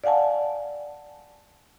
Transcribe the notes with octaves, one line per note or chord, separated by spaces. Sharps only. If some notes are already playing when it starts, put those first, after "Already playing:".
D5 F5 F#5 G#5 A5